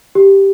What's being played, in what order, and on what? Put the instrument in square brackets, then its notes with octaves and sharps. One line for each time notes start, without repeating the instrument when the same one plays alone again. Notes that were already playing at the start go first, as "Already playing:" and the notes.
[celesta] G4